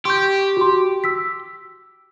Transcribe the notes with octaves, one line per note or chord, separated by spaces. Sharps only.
G4 C6 C#6 G6
F#4 C6
E6 B6